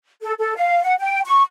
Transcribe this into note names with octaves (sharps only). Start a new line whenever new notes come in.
A4
A4
F5
F#5
G5
C#6